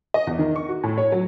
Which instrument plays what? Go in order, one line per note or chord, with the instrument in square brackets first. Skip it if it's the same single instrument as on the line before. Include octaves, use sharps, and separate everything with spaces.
[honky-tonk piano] D#5
E2
D#3
C#6
F#4
A2
C#5
F#3